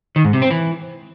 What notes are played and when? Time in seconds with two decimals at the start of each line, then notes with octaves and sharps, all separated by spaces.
0.16 D#3
0.25 G#2
0.33 C3
0.42 C4
0.51 E3